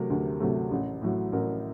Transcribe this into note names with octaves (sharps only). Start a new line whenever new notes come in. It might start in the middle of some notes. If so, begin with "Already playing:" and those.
Already playing: C3 F#3 A3 A#4
D2
C3 F#3 A3
A1
A2 F#3
A1 A#4